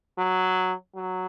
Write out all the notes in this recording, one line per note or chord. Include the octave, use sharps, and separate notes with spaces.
F#3
F#3